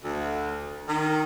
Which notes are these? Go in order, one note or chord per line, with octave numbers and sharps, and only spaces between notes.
D2
D#3